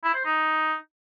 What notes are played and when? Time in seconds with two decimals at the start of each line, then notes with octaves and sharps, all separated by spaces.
0.04 E4
0.14 C5
0.25 D#4